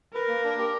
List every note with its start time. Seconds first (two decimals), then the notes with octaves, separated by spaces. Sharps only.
0.14 A#4 B4
0.28 A#3
0.44 D4
0.58 G4